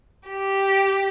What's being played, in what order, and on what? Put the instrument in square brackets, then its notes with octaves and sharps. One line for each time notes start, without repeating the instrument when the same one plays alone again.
[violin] G4